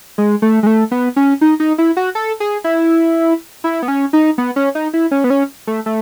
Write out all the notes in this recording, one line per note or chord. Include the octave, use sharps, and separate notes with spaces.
G#3
A3
G#3
A3
B3
C#4
D#4
D#4
E4
F#4
A4
G#4
E4
E4
B3
C#4
D#4
B3
C#4
D#4
E4
C#4
B3
C#4
A3
A3